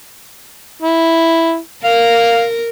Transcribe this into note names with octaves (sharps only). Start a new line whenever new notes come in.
E4
A#4 F5